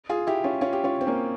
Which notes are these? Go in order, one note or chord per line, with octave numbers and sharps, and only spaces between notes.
F4 G#4
E4 G4
C#4 F4
C#4 F4
G4
C#4 F4
C4
A#3 C#4